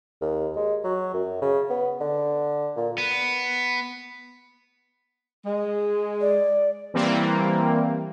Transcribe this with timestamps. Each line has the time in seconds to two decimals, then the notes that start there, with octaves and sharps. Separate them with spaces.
0.21 D#2
0.56 G#3
0.84 F#3
1.13 F#2
1.42 C#3
1.70 B3
2.01 D3
2.77 A#2
2.98 B3
5.46 G#3
6.20 D5
6.94 E3 G3 A#3 C4